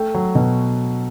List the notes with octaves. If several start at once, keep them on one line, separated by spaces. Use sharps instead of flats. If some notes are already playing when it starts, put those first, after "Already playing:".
Already playing: A3 G5
F#3
B2